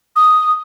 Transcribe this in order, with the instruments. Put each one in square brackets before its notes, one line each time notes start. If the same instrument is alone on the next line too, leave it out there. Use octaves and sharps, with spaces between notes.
[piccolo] D#6